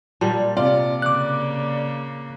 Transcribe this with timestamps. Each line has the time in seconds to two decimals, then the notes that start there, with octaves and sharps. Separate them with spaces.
0.21 A#2 G3 A5
0.57 C3 F4 D5
1.02 C#3 A#3 D6 F#6